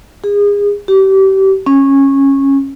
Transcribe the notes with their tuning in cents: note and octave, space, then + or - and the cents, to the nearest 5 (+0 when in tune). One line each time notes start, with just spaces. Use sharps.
G#4 -30
G4 -30
C#4 -15